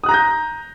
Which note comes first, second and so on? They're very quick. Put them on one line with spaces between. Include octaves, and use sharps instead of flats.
D#6 F#6 A#5 A#6 G6